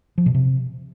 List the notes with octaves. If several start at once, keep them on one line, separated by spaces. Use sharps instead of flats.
F3
B2
C3